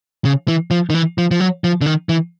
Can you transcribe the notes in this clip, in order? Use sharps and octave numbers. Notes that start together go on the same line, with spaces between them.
C#3
E3
F3
D#3
E3
F3
F3
F#3
F3
D3
D#3
E3